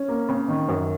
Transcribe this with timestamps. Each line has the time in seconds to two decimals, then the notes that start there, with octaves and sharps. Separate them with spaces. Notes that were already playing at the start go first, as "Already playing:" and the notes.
Already playing: C#4
0.08 A#3
0.29 C#3
0.48 D#3
0.68 F#2